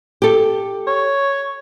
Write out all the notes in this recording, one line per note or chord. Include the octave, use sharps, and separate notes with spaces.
G4 A4
C#5